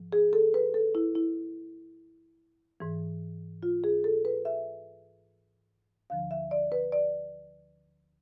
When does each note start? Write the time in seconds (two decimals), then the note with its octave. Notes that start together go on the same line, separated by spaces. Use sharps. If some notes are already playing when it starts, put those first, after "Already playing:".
Already playing: G#2 F3
0.12 G#4
0.33 A4
0.54 B4
0.74 A4
0.95 E4
1.15 E4
2.80 G#2 E3
3.63 F4
3.84 G#4
4.04 A4
4.25 B4
4.45 E5
6.10 D2 D3 F3 F5
6.31 E5
6.51 D5
6.72 B4
6.92 D5